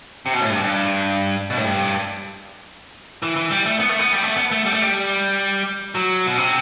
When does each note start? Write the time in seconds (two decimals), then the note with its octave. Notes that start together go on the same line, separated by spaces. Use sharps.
0.26 C3
0.34 B2
0.41 A2
0.50 G2
0.64 G2
1.50 B2
1.57 A2
1.65 G2
3.23 E3
3.36 E3
3.51 G3
3.66 A3
3.80 B3
3.89 A3
3.99 B3
4.13 G3
4.23 A3
4.37 B3
4.51 A3
4.66 G3
4.74 A3
4.82 G3
5.95 F#3
6.27 B2
6.37 C3